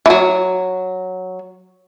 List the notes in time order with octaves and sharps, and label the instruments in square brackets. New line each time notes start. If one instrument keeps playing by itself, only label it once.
[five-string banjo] E3 F#3